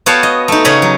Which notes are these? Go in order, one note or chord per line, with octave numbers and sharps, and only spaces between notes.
B3 F#4 C#5 F5 G5 A5
D#5
A3 D#4
C#3 C#4 C#5 D#5 A#5 B5
F#3